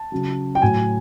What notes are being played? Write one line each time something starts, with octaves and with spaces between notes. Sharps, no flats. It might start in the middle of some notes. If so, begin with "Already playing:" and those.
Already playing: A5
C#3 F#3
G5
A2 F#3 G#5